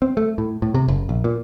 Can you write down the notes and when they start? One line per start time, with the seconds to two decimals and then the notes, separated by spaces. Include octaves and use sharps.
0.02 C4
0.17 A3
0.38 A2
0.62 A2
0.74 C3
0.88 F#1
1.09 A#1
1.24 A#2